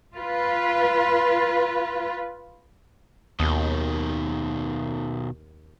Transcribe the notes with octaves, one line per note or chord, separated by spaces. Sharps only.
F4 B4
D#2 B2 D#3